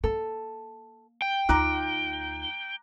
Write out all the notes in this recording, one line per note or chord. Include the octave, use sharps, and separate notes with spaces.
A#3 A4
G5
D2 D#4 F4 A#5 D6 F#6